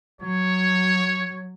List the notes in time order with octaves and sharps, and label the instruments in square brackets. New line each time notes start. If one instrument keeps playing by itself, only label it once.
[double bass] F#3 [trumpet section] C#5